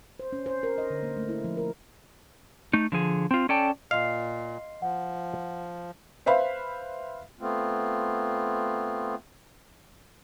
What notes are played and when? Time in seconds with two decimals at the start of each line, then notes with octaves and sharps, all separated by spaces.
0.20 C5
0.33 C#4
0.46 C5
0.63 A#4
0.78 D#5
0.90 D3
1.03 A#3
1.17 A3
1.29 E4
1.44 F3
1.57 A#4
2.73 A3 D#4
2.92 D3 F3 G#4
3.31 C4 F4
3.49 C#4 A4 D5 G5 A5
3.91 A#2 D#5 F5 C6 C7
4.82 F3 F#5
6.26 B4 C5 E5 F5 B5
7.41 A3 B3 C4 F4